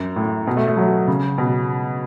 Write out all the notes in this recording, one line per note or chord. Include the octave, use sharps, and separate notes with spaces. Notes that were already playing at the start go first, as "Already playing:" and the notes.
Already playing: F#2
A2
B2
A3
A3
F#3
C#3
B2